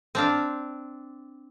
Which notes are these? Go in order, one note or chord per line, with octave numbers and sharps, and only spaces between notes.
C4 D4 F5